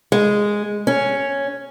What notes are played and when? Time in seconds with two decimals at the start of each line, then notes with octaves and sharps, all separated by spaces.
0.12 G#3
0.87 C#4